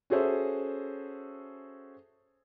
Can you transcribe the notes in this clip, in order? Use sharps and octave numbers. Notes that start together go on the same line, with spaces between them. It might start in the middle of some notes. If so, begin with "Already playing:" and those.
C#4 F#4 G#4 A4 C5 E5